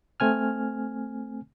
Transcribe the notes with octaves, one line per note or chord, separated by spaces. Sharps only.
A3 C4 G#5 F6